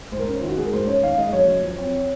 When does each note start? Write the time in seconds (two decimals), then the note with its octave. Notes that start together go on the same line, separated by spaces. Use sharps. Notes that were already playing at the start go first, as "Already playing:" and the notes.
0.12 G#2 C5
0.19 A#4
0.27 C#4 C5
0.40 D#3 F4
0.48 F#4
0.57 G#3 G#4
0.65 A#4
0.73 G#2 C5
0.87 C#4 C#5
1.03 D#3 F5
1.18 G#3 D#5
1.33 F#2 C#5
1.48 F#2
1.63 F3
1.78 C4